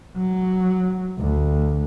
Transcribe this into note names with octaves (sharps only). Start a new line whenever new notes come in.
F#3
D2